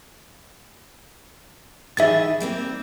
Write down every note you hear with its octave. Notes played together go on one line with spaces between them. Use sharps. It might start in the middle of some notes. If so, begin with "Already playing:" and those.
D#3 E3 G#4 E5 A6
G3 A#3 C4